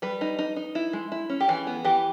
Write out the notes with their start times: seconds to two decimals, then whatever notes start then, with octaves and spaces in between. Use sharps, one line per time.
0.02 G3 B4
0.21 D#4
0.39 D#4
0.56 D#4
0.75 E4
0.93 G#3
1.12 E4
1.29 C#4
1.40 G4
1.48 E3 G#4
1.67 B3
1.85 E3 G4